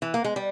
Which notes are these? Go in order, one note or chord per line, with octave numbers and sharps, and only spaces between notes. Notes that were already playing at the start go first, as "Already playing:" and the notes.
E3
A#3
G#3
G3